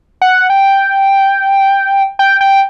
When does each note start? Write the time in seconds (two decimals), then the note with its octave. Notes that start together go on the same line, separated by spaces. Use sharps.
0.22 F#5
0.50 G5
2.19 G5
2.41 G5